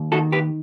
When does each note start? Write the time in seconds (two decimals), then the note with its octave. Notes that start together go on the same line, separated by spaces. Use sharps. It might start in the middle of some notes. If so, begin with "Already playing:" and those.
Already playing: D#2
0.12 D#3 F#4 A4
0.32 G4 B4